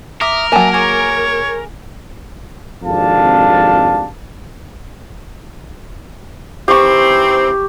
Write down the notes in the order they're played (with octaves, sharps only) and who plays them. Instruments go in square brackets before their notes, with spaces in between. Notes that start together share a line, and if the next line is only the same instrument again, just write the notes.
[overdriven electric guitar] A#4 [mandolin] E5 D6 D#6
[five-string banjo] F#3 A#3 [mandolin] E5 G#5 A5
[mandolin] G#4 D6 [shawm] C#5
[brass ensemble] G#1 F2 C3 D4 F5 A5
[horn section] D#3 E3 C4 [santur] G4 C#6